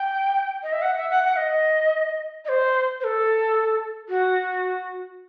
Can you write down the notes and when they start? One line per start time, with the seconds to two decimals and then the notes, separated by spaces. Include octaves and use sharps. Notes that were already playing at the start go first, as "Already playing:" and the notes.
Already playing: G5
0.63 D#5
0.73 E5
0.82 F#5
0.97 E5
1.10 F#5
1.24 F#5
1.36 D#5
2.45 D#5
2.49 C5
3.00 C5
3.04 A4
4.09 F#4